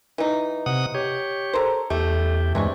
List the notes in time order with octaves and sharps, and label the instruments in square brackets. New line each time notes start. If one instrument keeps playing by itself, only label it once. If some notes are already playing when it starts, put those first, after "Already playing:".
[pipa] E3 D#4
[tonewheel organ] C3 F#5 D#6
G4 C#5
[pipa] A4 A#4 C5
[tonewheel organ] E2 G4 [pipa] A3
[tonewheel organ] G2 E3 G#3 [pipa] C3 D4 C#6